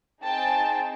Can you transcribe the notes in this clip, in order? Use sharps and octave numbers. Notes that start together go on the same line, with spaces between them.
C4 D#4 G#4 G5 A5